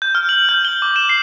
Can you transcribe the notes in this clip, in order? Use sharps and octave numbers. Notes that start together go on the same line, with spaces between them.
G6
F6
F#7
G6
G7
D6
E7
C7